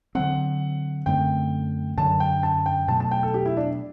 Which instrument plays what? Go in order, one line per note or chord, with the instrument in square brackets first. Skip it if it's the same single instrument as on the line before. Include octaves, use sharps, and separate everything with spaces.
[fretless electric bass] D3 F#3 C4 [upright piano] F#5
[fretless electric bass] F#2 D3 A3 C4 [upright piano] G5
[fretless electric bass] F#2 D3 F#3 [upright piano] A5
[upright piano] G5
A5
G5
[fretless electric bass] B2 F#3 A3 [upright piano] A5
[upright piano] A5
G5
A4
G4
E4
D4